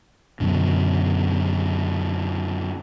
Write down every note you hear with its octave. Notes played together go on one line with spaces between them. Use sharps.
F#2 B2 D3